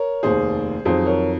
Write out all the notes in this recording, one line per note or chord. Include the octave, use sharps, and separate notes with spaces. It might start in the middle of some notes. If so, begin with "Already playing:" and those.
Already playing: A#4 C#5
F1 D#2 D#3 G#4 C5
F2 D#3 F#3 G#4 C5
A#4 C#5